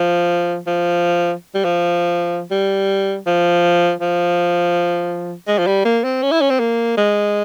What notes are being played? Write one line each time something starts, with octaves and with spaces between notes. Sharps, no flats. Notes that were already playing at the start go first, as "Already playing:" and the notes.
Already playing: F3
F3
G3
F3
G3
F3
F3
G#3
F3
G3
A#3
C4
C#4
E4
C#4
C4
A#3
G#3